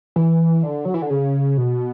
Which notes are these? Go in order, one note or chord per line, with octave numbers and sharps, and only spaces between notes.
E3
D3
F#3
E3
D3
C#3
B2